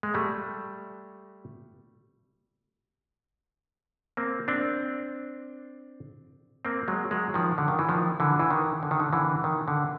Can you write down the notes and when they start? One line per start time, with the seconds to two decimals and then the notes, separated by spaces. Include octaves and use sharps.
0.03 G#3
0.14 G3 A3
4.17 A#3 C4
4.48 C4 D4
6.65 A#3 C4
6.88 F#3 G#3
7.11 F#3 G#3
7.34 D#3 F3
7.58 D3
7.68 D#3
7.79 E3
7.89 D#3 F3
8.20 D3 E3
8.40 E3
8.51 D#3
8.83 D3
8.91 D#3
9.00 D3
9.13 D3 E3
9.44 D#3
9.68 D3